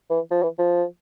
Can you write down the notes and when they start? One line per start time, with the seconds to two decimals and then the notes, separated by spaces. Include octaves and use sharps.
0.10 E3
0.31 F3
0.43 E3
0.59 F3